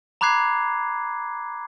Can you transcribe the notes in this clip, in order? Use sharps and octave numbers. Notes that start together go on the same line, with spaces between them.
A#5 B5 D6 F#6 G#6 C7